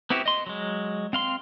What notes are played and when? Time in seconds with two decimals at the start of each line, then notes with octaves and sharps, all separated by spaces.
0.10 B3 C4 E4 F#4 G4
0.26 D#5 C6
0.46 F#3 G#3
1.13 C4 F5 C6